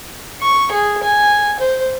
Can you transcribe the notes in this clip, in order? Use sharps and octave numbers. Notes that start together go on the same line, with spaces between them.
C#6
G#4
G#5
C5